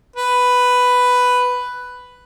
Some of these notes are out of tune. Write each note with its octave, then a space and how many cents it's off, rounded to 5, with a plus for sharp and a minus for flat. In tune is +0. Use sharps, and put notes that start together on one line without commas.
B4 +5